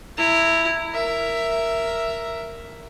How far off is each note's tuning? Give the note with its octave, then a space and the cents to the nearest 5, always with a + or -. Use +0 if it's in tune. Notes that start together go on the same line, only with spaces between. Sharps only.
E4 +0 A#5 -25
A#4 +0 E5 +10